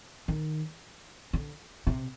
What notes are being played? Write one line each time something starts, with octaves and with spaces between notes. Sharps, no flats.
D#3
D3
C3